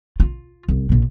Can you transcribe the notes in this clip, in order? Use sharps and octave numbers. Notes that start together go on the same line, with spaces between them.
F4
C2
A#1 C3